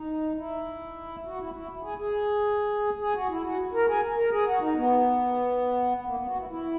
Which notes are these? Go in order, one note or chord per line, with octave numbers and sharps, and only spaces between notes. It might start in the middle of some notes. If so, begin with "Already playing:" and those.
Already playing: D#4
E4
F#4
E4
E4
G#4
G#4
G#4
F#4
E4
F#4
A#4
G#4
A#4
G#4
F#4
D#4
B3
A#3
B3
F#4
E4
E4